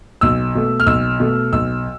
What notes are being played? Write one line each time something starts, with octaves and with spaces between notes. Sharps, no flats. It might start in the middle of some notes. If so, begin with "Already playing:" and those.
B1 E6
B2 A3
F6
B1 E6
B2 A3
B1 E6